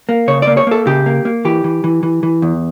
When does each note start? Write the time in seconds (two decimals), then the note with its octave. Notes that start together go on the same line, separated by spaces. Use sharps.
0.09 A#3
0.28 C#3 C#5
0.42 A#3 D5
0.57 C#5
0.67 A#3 A4
0.87 C#3 G4
1.06 A#3
1.25 A#3
1.45 E3 G4
1.64 E3
1.84 E3
2.03 E3
2.23 E3
2.42 E2